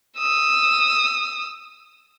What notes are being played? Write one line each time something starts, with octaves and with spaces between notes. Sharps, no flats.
D#6 E6